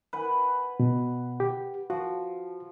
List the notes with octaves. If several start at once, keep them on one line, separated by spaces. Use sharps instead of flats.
B4 F#5 G#5
B2
G4
F3 F#4